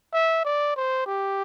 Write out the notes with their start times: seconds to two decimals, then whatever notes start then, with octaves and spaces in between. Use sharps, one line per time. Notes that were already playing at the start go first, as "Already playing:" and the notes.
0.13 E5
0.45 D5
0.76 C5
1.06 G4